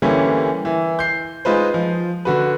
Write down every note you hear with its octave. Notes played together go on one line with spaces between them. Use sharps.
D3 E3 G3 A#3 C#4
E3
G6 C7
G#3 D#4 F4 B4 C5
F3
D3 F#4 B4